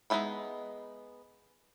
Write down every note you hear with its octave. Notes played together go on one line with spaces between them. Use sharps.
G#3 B3 D#4 E5 B5